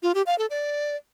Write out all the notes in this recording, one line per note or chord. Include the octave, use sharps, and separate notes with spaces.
F4
G4
F5
A4
D5